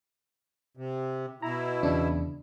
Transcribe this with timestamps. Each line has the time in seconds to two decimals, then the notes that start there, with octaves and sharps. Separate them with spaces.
0.77 C3
1.42 B2 E4 A#5
1.83 E2 C#3 D4